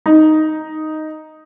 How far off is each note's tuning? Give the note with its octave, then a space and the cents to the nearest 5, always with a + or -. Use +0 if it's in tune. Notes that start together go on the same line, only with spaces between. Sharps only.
D#4 +0